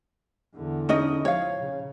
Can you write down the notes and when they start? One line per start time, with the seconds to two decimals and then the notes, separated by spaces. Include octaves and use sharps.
0.55 E2 D3
0.89 C#4 D#4 D#5
1.25 F3 C#5 F5
1.60 C#3